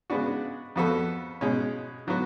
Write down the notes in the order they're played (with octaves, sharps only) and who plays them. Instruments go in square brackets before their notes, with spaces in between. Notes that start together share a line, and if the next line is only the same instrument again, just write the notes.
[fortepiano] C#3 G#3 B3 D4 F#4
F2 F3 B3 F#4 A4
B2 G#3 C#4
D3 F#3 B3 F#4